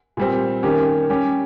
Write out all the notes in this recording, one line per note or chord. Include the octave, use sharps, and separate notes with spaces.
A#2 G3 C4
D#3 A#3 C#4 G4
G3 C#4 G4